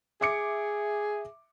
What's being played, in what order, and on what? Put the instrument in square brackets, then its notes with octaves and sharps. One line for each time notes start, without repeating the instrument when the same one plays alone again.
[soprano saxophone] G#4 [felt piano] E5 D6 C#7